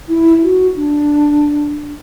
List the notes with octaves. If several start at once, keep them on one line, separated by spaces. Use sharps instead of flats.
E4
F#4
D4